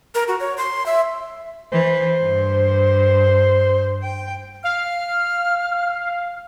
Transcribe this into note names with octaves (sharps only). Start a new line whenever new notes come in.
A#4
F#4
C#5
C6
E5
E3 C5
G2
G5
F5 F6